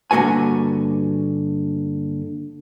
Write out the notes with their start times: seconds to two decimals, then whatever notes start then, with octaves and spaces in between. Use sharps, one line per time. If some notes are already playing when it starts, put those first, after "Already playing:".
0.11 G2 D3 A#3 F#4 B4 G#5